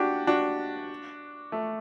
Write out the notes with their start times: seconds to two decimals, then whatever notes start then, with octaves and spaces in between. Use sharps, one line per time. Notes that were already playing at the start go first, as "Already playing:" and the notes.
Already playing: D4 F#4 G4
0.27 D4 F#4
1.52 A3